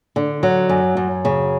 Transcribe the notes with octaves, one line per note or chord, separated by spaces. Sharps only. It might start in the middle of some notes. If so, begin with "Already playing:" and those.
D3
F#3
F#2
F#2
C#3